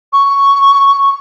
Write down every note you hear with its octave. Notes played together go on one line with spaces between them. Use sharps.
C#6